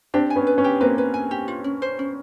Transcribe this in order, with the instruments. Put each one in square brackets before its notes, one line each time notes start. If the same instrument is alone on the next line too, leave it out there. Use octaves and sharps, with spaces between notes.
[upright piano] C4 D4 [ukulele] G4
[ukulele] G#5
[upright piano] B3 C#4
[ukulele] B4
[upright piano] B3 C#4
[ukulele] G4
[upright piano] A#3 C4 [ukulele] B4
[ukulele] B4
G#5
G4
F4
C#4
C5
C#4